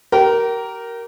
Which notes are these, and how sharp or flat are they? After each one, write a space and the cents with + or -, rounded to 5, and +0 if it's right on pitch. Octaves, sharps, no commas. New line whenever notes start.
G4 -30 A#4 +0